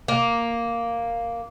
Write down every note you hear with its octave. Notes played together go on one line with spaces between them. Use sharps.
A#3